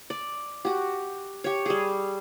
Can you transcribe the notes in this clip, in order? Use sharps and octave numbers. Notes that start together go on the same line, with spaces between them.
D5
F#4 G4
G4 C#5
G3 G#4